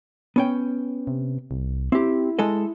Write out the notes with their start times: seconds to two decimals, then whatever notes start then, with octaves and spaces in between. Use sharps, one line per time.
0.36 B3 C#4 G5
1.07 C3
1.51 C2
1.92 C4 E4 G4
2.39 G#3 A4 D#5